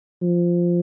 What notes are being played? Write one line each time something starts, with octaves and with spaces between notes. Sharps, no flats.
F3